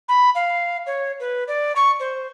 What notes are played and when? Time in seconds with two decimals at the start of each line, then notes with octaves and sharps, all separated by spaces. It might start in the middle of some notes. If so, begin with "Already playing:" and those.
0.09 B5
0.35 F5
0.87 C#5
1.20 B4
1.48 D5
1.76 C#6
2.00 C5